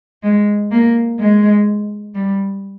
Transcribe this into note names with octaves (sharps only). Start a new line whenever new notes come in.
G#3
A#3
G#3
G3